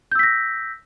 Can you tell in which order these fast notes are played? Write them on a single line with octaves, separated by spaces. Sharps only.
G6 E6 B6 A#6